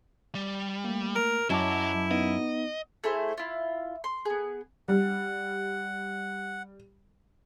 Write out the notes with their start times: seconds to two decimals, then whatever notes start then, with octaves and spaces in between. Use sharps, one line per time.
0.35 G3
0.84 A3 A#3
1.15 A#4
1.50 F#2 F#3 E4 D#5 A5 D6
2.11 B3 D#4 D#5
3.04 A3 E4 G#4 C5
3.37 E4 F4
4.04 C6
4.25 B3 G#4
4.88 G3 F#5